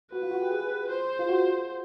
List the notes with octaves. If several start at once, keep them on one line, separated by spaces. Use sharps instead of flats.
F#4 B4
F4
F#4
G4
G#4
C5
F4
F#4